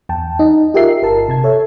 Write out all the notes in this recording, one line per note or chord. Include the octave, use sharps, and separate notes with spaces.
E2 G5 A5
D#4 D#5
F4 G4 G#4 A#4 E5 C7
G1 A#4 A5
C3 A5 G#6
A4 C#5 E5